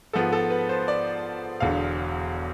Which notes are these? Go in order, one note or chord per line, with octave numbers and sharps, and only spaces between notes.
G#2 F3 B3 A4
A4
B4
C5
D5
E1 E2 D3 F5